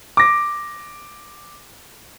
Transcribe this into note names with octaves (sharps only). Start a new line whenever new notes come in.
D6 A#6